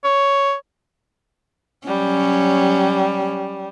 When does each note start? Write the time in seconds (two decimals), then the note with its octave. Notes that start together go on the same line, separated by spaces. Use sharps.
0.04 C#5
1.87 F#3 G3 C#4